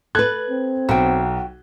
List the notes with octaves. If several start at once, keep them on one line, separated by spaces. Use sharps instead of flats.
A4 B4 F#6 G#6
C4
B1 F#4 G5